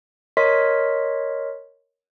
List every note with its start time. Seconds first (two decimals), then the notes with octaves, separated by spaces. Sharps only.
0.37 A#4 C#5 D#5 C6 B6